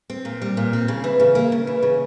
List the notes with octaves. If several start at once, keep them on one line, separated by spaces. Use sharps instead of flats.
C4
A#2
G3
A#2
C4
C#3
E3
C#3
A#3
C#3
E3
C#3